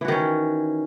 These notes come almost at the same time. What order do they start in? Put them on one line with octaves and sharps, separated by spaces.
E3 F#4 D#3 C#4